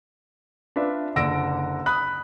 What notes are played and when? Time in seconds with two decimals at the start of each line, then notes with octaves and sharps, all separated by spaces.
0.76 D4 F4 B4 E5
1.16 F#1 D3 E6 A#6 D7
1.86 B5 D#6 F#6